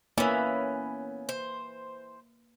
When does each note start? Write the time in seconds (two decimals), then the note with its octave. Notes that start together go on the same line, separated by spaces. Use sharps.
0.18 E3 A#3 B3 C#4 B4 E5
1.29 C5